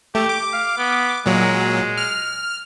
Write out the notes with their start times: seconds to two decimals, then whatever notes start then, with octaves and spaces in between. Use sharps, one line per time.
0.15 A3 G4
0.29 D6
0.53 F5
0.78 B3
1.26 A#2 F#3 G#3
1.98 F6